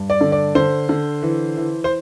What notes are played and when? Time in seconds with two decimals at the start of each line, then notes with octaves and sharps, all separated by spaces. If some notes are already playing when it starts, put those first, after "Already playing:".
Already playing: G2
0.10 D5
0.21 D3
0.32 D5
0.55 D3 C5
0.89 D3
1.23 E3
1.57 E3
1.84 C5